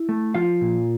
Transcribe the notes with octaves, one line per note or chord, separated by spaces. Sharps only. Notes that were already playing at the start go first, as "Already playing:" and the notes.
Already playing: E4
A3
F3 F4 F5
A#2